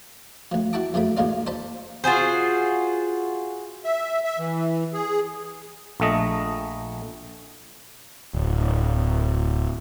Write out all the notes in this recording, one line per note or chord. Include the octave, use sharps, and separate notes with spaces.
D2 F3
E4 F#4 G5 A5 D6
F#2 C#3 F3 A3 B5
A1 D2 G#3 A#3 F4 D5
C5 D5 A5 B5
F4 F#4 G#4 C5
E5
E5
E3
G#4
A#1 A3 D#5
D1